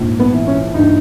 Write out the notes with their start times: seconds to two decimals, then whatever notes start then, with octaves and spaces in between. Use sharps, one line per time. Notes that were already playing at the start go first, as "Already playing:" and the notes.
Already playing: A#1 G#2
0.20 B3
0.33 E3
0.47 C#4
0.74 G2 D#4